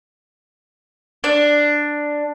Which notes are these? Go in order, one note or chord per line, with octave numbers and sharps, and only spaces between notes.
D4